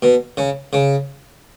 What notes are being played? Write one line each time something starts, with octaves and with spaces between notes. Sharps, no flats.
B2
C#3
C#3